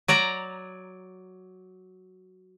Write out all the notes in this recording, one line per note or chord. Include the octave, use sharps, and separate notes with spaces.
F#3 D5 A#5